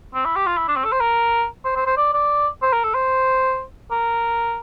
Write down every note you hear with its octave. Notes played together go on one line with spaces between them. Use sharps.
C4
E4
G4
F4
E4
D4
C4
A4
C5
A#4
C5
C5
C5
D5
D5
C5
A#4
A4
C5
A#4